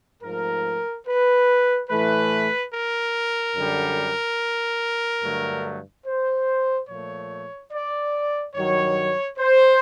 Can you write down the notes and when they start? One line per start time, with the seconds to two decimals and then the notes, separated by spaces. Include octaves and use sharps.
0.23 G#2 F3 A3 A#4
1.06 B4
1.90 A2 E3 A3 B4
2.72 A#4
3.56 F#2 D3 G3
5.22 G2 D3 F#3 A3
6.06 C5
6.88 A#2 F3 A3 C#5
7.72 D5
8.55 G2 D#3 F#3 C#5
9.38 C5